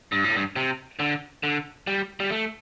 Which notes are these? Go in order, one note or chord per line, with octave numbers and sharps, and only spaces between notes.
G2
A2
G2
C3
D3
D3
G3
G3
A3